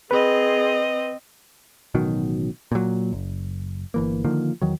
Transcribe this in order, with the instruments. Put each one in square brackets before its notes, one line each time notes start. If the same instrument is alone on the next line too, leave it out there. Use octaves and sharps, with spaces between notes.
[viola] C4 D#5 [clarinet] G#4 [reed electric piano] B4
[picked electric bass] A1 B2 D#3 F#3
A#2 F#3
F#1
G1 E3 A#3
D3 D#3 F3 A#3
E2 D#3 F#3